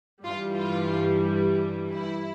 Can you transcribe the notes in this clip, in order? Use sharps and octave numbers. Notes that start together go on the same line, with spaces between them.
G2 E3 G3 F4
F4
E4